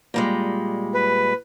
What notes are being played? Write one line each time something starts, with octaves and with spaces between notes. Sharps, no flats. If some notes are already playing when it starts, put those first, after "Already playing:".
A#2 G3 G#3
B4